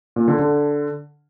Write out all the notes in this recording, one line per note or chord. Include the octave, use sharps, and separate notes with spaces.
A#2
D3
D3